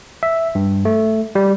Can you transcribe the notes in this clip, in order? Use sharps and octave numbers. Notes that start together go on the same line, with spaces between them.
E5
G2
A3
G3